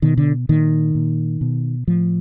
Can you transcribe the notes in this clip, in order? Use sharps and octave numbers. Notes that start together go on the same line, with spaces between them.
B2 D#3
D3
A#2 D#3
A#2
B2
A2 F3